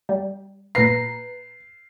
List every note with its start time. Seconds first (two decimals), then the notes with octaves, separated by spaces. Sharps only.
0.09 G3
0.75 A#2 B4 A#5 C7